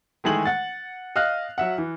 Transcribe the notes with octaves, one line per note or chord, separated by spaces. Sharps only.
D#3 E3 G#3 A3 G#4 F#7
F#5 A6
D#5 F5 F6 F#6
F#3 E5 F#5
E3